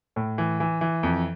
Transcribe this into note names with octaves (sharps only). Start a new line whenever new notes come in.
A2
E3
E3
E3
F2